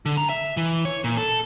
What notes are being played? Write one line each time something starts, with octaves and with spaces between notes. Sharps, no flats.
D3
A#5
E5
E3
C#5
A#2
A4